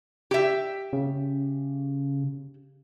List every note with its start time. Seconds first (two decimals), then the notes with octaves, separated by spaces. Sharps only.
0.31 G4 E5
0.93 C#3